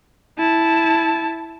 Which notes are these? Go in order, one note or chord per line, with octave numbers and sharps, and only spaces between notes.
E4 A5